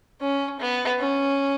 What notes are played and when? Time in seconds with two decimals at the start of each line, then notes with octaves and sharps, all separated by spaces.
0.20 C#4
0.60 B3
0.99 C#4